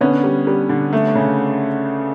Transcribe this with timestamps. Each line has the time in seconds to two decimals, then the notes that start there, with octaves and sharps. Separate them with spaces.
0.01 D3 B3 C#4
0.24 G3
0.47 G3
0.69 D3
0.93 A3
1.15 C#3